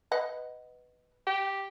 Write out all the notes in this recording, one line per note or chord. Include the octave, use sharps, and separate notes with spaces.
B4 D#5 F#5
G4